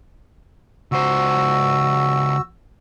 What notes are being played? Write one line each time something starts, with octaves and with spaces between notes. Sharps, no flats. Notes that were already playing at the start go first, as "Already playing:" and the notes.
C#2 F#4 C5 E6